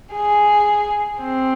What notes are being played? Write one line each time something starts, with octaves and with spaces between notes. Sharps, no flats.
G#4
C4